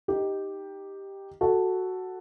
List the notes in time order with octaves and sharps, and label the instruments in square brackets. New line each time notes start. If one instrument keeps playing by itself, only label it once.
[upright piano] D#4 G4
F#4 A4